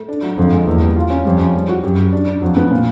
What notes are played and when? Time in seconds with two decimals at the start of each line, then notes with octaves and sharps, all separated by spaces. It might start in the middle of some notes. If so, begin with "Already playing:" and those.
Already playing: A3
0.08 D4
0.23 F#3
0.38 F2 D3
0.52 G#3
0.66 E2 A#3
0.81 G3
0.96 F4
1.10 C#4
1.25 F2 G3
1.39 C#4
1.55 G3
1.69 F#4
1.83 F#2 G4
1.98 G4
2.13 D4
2.27 D4
2.42 F2 F#3
2.57 B3
2.71 A#2